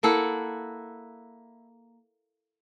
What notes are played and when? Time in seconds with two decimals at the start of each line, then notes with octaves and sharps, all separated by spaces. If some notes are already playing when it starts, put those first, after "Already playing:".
0.03 A#3 E4 A4 F#5